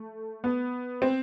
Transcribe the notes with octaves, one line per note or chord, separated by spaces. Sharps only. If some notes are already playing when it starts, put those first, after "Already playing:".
Already playing: A3
B3
C4